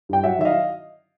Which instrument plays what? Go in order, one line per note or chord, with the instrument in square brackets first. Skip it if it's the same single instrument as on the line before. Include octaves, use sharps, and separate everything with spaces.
[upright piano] G2 G5
F#3 E5 F#5
D#3 E5
D#5 F5